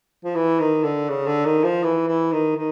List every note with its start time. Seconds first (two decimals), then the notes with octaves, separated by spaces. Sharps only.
0.24 F3
0.35 E3
0.60 D#3
0.83 D3
1.09 C#3
1.27 D3
1.45 D#3
1.64 F3
1.83 E3
2.07 E3
2.32 D#3
2.56 D#3